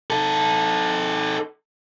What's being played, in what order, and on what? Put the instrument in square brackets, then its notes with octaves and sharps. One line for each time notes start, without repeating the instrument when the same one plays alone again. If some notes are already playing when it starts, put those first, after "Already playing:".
[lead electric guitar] D#4 A4